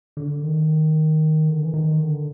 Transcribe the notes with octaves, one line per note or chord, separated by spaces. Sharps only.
D3
D#3
D3
E3
D#3
D3